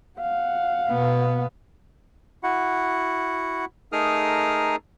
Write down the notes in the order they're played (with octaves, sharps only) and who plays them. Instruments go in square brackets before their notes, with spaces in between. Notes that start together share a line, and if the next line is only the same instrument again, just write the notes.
[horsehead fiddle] F5 F#5
[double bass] B2 B3
[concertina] E4 F#4 F#5
A3 D#4 G#4 A#4 D#6 F6